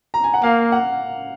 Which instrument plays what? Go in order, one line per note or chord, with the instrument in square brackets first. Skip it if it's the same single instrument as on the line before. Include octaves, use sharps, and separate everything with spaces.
[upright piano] A#5
G#5
F#5
[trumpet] A#3 [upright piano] F5
[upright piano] F#5